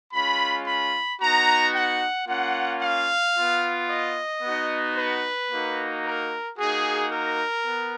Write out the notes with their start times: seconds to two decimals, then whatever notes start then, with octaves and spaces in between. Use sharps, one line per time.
0.13 G#3 C#4 F4 B5
0.67 B5
1.21 B3 D#4 F#4 A#5
1.75 F#5
2.28 A#3 C#4 F4 F#5
2.82 F5
3.35 F4
3.41 B3
3.89 D#5
4.43 B3 D#4 F#4
4.97 B4
5.51 A#3 D#4 F#4
6.05 A#4
6.58 A#3 D#4 F#4 G#4
7.12 A#4
7.66 B3